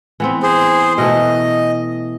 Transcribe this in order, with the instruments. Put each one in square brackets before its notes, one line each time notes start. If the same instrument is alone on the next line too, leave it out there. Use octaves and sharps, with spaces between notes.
[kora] E3 B3 C4
[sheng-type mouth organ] G#4 C5
[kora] B2 E3 A3 [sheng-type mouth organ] D#5